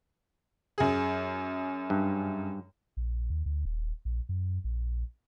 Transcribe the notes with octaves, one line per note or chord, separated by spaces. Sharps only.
F#2 G#4
G2
A#1
D#2
D2
D#1
A#1
F#2
A#1